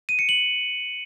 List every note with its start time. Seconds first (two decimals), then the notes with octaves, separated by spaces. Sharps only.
0.09 D#7
0.19 C#7
0.29 F#7